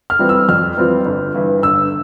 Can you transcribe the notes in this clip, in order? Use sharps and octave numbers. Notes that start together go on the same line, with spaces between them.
F6
E3 G3 C4 F4
E6
F2 F6
E3 G3 C4 F4
G1
G2 E3 B3
G1 E6